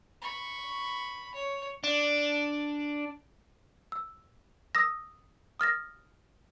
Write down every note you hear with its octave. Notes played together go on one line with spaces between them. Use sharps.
B5 C#6
C#5
D4
E6
D#6 E6 A#6
D#6 F6 A6 A#6